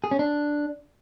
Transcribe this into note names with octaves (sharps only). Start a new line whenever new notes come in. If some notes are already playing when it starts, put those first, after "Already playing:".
G#4
C#4
D4